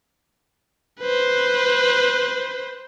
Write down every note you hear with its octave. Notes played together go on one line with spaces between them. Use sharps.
B4 C5